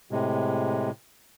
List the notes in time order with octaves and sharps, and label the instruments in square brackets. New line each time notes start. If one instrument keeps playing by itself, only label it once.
[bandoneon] A2 C3 G#3